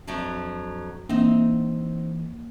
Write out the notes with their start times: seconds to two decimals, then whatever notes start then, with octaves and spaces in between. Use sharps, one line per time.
0.07 F2 F#3 D4
1.09 E3 A#3 C4 D#4